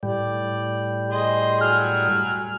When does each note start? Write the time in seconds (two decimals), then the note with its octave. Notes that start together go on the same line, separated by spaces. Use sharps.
0.03 A2 G3 D5
1.09 G#4 C5 D#5
1.61 F#3 G#5 F6